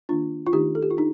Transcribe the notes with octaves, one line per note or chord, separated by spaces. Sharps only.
D#3 A#3 D4 F4
F4
D#3 A3 D4 D#4 G4
A4
G4
F4
D4 D#4